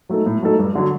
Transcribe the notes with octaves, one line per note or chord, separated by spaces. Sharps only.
F#3 A3 D#4 A4
A2
F#3 A3 D#4 A4
G2
D3 F#3